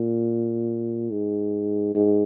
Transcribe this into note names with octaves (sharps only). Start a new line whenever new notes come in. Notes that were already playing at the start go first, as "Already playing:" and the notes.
Already playing: A#2
G#2
G#2